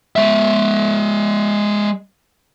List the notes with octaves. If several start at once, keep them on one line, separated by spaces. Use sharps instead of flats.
G#3 E5